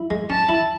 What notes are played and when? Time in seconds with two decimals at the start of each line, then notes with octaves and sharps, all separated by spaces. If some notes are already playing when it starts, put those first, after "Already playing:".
Already playing: E4
0.10 G#3
0.30 C#4 A5
0.49 E4